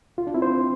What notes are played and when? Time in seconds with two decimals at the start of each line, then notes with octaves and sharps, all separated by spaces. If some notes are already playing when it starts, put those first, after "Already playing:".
0.17 C2 F4
0.27 D4
0.34 C4 E4
0.42 C5
0.50 C4